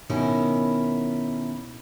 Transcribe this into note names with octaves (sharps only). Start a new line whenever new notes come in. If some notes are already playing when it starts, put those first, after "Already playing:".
B2 D#3 C#4 E4 A#4